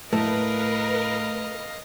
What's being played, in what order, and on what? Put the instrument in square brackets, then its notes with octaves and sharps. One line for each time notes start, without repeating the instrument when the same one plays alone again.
[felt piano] A2 [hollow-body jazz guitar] A3 [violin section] A#4 B4 [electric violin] D#5 F5